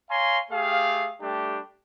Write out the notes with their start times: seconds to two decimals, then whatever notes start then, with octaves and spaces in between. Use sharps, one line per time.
0.10 C#5 F5 G#5 A#5 C6
0.51 A3 G4 G#4 F5
1.22 G3 A3 D4 G4